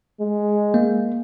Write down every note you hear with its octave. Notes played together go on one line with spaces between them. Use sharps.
G#3
A#3